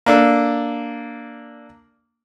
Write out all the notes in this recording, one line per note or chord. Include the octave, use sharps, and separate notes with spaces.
A#3 D4 A4